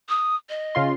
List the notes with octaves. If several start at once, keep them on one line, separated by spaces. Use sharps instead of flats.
D#6
D#5
C#3 F4 C6